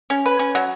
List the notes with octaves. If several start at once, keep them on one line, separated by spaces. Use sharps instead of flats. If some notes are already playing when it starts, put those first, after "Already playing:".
C#4
B4
C#4
F#3